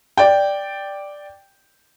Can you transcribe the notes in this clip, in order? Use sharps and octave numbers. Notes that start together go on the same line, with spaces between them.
D5 G5